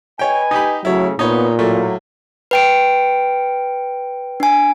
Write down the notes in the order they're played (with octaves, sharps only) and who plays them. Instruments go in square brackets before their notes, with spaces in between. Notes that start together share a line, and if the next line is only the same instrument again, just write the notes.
[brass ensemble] B4 D#5 G#5 [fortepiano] C#5 G5
[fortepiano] D#4 G4 B5
[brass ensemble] C#3 A3 [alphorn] F#3 [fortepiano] E4 C#5
[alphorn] A#2 [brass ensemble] B3 [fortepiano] D#4 C#5
[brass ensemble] A2 F#3 [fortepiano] A3 A#3
[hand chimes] B4 G5 D7
D4 G#5